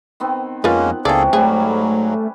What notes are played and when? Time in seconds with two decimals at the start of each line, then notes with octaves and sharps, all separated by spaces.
0.20 D#3 B3 C4
0.64 F2 G#3 A#3 C#4 F4 A#4 B4 F#5
1.05 C#2 C3 E3 A#3 C#4 G#4 A4 D5
1.33 G#2 F#3 G3 A3 G#4 B4